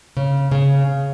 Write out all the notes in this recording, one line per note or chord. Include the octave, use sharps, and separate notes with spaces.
C#3
C#3